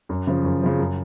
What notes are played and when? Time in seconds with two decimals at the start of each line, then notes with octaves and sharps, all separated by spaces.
0.09 F#2
0.27 C#3 F3
0.44 F#2
0.62 C#3 F3
0.79 F#2